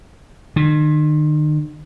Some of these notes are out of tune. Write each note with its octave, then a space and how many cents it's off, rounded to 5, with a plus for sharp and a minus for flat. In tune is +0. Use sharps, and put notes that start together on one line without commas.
D#3 -40